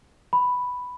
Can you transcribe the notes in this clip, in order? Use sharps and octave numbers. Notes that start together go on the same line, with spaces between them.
B5